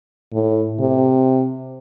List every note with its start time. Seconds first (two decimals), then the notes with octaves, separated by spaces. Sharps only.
0.33 A2
0.79 C3